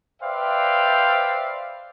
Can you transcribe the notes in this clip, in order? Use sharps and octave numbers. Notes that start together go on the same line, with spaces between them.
B4 C5 D5 E5 F5 G5